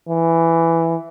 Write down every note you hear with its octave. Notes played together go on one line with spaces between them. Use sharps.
E3